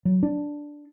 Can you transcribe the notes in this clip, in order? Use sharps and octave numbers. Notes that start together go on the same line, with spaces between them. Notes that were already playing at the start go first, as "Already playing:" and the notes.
F#3
D4